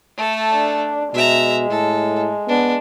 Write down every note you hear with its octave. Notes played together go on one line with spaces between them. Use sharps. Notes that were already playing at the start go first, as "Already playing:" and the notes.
A3 A4
D4
B2 G#3 E5 A#5
A2 A4
B3 D4